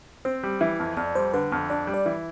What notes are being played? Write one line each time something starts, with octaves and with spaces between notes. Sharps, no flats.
C4 C5
G3
E3 E5
F2
F2 D5
G3 C5
D3 B4
F2
D4 D5
G3
D5
E3